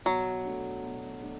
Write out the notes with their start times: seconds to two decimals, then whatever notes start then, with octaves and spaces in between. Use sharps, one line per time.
0.05 B2 F#3
0.45 A3 D4
0.84 B2
1.23 A3 D4